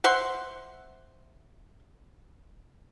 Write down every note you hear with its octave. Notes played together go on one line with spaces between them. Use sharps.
C5 E5 F#5 C6